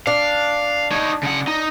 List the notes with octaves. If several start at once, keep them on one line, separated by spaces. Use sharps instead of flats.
D4 F5
D#4 C#5
C#3 F#5
D#4